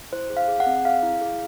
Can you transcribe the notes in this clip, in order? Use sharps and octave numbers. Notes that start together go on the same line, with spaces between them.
E4 C5
G#4
F5
G#4
F#5
C4
G#4 F5
E4
G#4